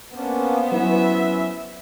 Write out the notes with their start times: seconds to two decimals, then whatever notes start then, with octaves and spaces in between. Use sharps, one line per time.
0.15 A#3 B3 C#4 D4 C5
0.72 F#3 C#4 E4 B4 E5